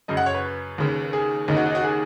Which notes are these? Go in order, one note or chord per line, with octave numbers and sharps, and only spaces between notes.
F#2 C#3 D#5
F#5
C#5
B4
D#2 C#3
G#4
D#2 C#3 D#4
F#4
D#4
F#4
G#4